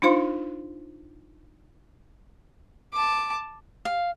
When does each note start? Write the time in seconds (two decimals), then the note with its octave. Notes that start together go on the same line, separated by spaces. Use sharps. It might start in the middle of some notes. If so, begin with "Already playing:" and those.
0.02 D4 D#4 F4 C5 F5 C6
2.93 A5 D6
3.85 F5